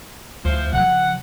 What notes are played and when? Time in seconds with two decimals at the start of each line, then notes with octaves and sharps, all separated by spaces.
0.45 D2 E3 F3 C5
0.73 C#3 F3 F#5